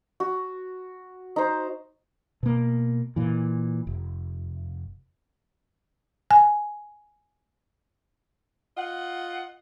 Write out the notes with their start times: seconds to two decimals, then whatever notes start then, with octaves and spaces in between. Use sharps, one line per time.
0.20 F#4
1.36 D#4 C5
2.43 B2 A#3
3.16 A#2 E3
3.87 F1
6.31 G#5
8.77 F4 D#5 F#5